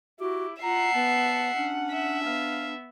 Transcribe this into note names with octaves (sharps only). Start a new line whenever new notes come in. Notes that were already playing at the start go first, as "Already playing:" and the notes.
E4 F#4 G4
F4 E5 F#5 A#5 C7
B3 A5
C#4 D4
E5
B3 F5